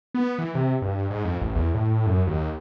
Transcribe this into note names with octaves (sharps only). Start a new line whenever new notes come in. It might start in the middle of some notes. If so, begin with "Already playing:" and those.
B3
E3
C3
G2
G#2
F2
A1
E2
A2
F#2
D#2